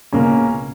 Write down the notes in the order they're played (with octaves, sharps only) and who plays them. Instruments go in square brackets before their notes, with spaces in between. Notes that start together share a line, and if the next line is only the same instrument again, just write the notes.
[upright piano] C#2 B2 A#3 C#4